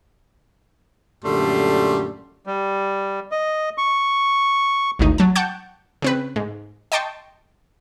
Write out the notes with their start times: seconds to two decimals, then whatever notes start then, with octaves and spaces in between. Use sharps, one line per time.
1.25 F#2 A#2 D3 G3 A3 C6
2.47 G3
3.32 D#5
3.78 C#6
4.99 G#1 D2 D#4
5.18 F#3 A5
5.35 F#5 G5 A5 C#6 F#6 G6
6.02 C#3 C4 B4
6.36 G#2
6.92 D#5 G5 A5 C6 C#6